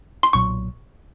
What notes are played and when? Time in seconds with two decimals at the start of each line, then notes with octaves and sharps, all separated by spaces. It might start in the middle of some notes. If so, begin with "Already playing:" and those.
0.23 C6
0.33 B1 A#2 F#3 C#6